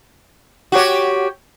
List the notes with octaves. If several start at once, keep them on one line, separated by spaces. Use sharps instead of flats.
F#4 G4 C#5